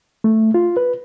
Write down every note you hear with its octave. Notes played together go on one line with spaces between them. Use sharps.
A3
F4
B4